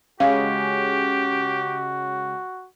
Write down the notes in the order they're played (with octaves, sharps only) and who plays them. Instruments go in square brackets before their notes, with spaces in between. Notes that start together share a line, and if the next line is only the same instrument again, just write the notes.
[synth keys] C#3 G#3 C#4 [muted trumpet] F#4 [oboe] G4 [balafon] F5